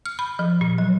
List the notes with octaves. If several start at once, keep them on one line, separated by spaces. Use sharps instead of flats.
F6
B5
F3
A#2
F#3